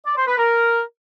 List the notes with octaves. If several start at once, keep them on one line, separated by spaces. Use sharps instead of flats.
D5
C5
B4
A#4